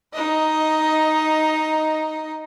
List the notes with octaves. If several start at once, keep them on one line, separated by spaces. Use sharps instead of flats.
D#4 D#5